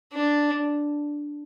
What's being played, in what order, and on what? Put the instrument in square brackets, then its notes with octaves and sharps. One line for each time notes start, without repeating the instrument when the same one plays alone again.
[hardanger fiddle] D4